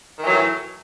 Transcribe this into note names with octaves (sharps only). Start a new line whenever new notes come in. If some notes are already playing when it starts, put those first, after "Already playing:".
A2 D#3 E3 F#3